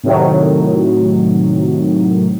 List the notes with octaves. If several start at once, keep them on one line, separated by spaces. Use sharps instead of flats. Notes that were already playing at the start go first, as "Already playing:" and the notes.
A2 C3 D#3 F#3